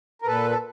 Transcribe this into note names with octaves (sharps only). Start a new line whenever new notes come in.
A#4
A#2 A4 B4
A4